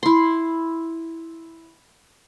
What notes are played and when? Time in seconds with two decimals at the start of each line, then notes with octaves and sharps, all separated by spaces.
0.03 E4 C6